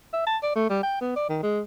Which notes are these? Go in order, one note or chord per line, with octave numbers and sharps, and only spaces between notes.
E5
A5
D5
A3
G3
G5
B3
D5
D#3
G#3